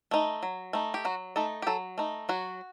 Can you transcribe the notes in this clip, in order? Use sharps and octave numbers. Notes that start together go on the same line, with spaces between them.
A3 D#4
F#3
A3 D#4
G4
F#3 F#4
A3 D#4 A4
G4
F#3 A4
A3 D#4
F#3 F#4